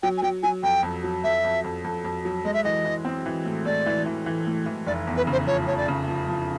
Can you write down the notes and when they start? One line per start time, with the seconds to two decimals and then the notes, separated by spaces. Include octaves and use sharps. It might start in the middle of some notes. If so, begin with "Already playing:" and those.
0.03 F#3 G5
0.18 G#5
0.22 F#3 G5
0.43 F#3 G#5
0.63 F2 G5
0.83 F2
1.04 F#3
1.24 F2 E5
1.44 F2
1.64 F2
1.84 F2
2.05 F2
2.25 F#3
2.45 G#3 D#5
2.54 E5
2.64 E3 D#5
2.85 E3
3.05 C4
3.26 E3
3.46 A2
3.65 A2 D5
3.86 E3
4.06 E3
4.26 E3
4.47 A2
4.66 E3
4.87 F1 D5
5.07 E2
5.17 B4
5.27 C#3
5.32 C5
5.47 F3 C#5
5.67 F3 C#5
5.77 D5
5.88 C#3
6.08 F3
6.28 F3